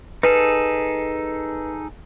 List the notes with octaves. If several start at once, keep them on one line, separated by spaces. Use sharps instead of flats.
D#4 G#4 A4 B4